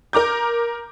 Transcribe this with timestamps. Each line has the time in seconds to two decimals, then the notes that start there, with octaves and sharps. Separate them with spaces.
0.13 A#4 A#5 D6 G6